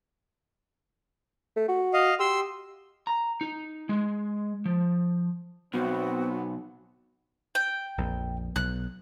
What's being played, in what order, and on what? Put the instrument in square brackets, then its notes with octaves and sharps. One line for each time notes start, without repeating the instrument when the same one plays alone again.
[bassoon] A3
F#4
[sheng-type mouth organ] D#5 F5
[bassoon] G4 [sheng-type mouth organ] C6 E6
[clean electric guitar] A#5
D#4
G#3
F3
[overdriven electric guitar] B1 [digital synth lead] B3 [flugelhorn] C4 [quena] F#4
[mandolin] G5
[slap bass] A#1 F2
[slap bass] B1 [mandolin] F#6